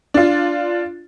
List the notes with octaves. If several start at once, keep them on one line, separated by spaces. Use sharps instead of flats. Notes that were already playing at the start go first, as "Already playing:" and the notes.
D4 F4